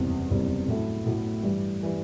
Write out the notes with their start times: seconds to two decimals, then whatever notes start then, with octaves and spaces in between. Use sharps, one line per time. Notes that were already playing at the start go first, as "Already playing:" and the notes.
Already playing: F#1 E2 C3 G3 C4
0.30 F#1 E2 C3 G3 C4
0.68 A2 F#3 A3 E4 A4
1.06 A2 F#3 A3 E4 A4
1.43 G2 E3 G3
1.83 E3 G3